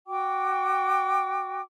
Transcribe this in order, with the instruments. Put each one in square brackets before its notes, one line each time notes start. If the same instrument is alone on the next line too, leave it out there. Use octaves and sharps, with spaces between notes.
[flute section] F#4 G5 D6